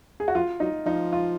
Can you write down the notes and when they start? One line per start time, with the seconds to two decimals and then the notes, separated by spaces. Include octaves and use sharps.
0.20 G#4
0.28 F#4
0.35 F3 F4
0.60 F#3 D#4
0.86 F3 D#4
1.13 F4